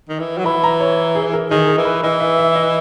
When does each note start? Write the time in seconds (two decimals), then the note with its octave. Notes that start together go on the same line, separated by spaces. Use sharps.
0.09 D#3
0.20 E3
0.38 F#3
0.45 E3 B5
0.64 A#5
0.81 C#5
1.15 G#4
1.33 A#4
1.51 D#3 G#4
1.68 A#4
1.77 E3
1.85 B4
2.03 E3 D#5
2.20 E5
2.38 E5
2.55 D#5